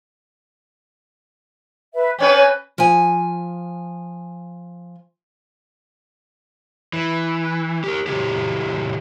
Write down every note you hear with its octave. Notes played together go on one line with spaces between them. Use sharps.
B4 E5
C4 C#4 B4 C#5 G#5
F3 G#5
E3
G4 A#4
C#3 E3 F#3 G4